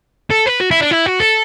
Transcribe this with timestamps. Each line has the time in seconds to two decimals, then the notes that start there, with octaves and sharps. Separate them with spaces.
0.31 A4
0.47 B4
0.61 F#4
0.71 E4
0.81 D4
0.91 E4
1.06 F#4
1.20 A4